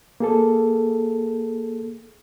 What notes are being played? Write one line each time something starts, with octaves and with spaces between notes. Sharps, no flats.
A#3 G#4 A4